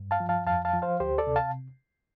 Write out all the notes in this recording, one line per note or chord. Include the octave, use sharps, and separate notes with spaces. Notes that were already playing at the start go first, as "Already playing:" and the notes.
Already playing: G2
F5 A5
F3
F5 A5
F2 F5 A5
F5 A5
F3
C5 F5
D2 G4 C5
A4 D5
C3
F5 A5